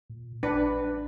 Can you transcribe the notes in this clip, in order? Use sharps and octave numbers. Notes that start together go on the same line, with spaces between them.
A#2
A1 D4 B4